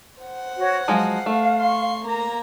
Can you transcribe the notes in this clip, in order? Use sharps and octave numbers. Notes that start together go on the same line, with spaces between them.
C5 F#5
F#4 C#5
F3 F#3 G#3 F5
A3
C6 C#6
A#3 A#5